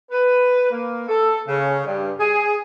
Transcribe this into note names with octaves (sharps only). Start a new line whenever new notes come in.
B4
A#3
A4
C#3
G2
G#4